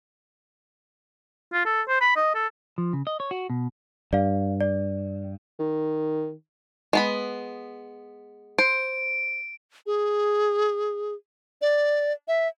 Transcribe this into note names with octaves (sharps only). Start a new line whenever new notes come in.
F4
A4
C5
B5
D#5
A4
F3
C#3
D#5
C#5
F#4
B2
G2 D5 F5
D5
D#3
G#3 B3 B5
C5 D7
G#4
D5
E5